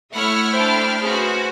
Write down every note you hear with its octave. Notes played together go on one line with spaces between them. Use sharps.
A3 E4 C#5 E5 F#5 B5 F6
D4 C5 G5
C#4 F#4 G#4 B4 C5